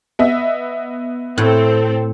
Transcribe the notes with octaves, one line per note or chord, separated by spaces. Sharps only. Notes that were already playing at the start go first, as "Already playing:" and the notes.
B3 D#5 E5
A2 C4 A4